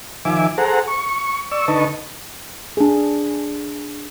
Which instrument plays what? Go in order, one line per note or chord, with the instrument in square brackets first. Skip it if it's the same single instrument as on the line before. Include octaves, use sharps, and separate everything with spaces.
[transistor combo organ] D#3 F3 E5 G#5 D6
G#4 A4 C5 F#5 A#5
C#6
D5 C#6 E6
D3 D#4 B4 D#5 A5 C#6
[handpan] D4 G#4